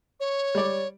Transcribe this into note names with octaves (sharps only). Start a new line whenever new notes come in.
C#5
G3 D5